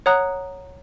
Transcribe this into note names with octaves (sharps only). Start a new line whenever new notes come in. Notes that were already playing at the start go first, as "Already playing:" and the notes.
C#5 F#5 A#5 D#6 F#6